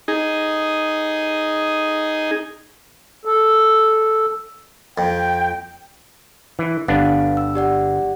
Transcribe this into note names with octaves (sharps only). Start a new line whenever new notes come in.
D#4 G#4
A4
F2 G5
E3
G1 B3 D4 F5
E6
G4 D5 F#5